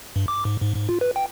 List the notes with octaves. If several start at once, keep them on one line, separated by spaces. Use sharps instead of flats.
G2
D6
G#2
G#2
G#2
F4
B4
G5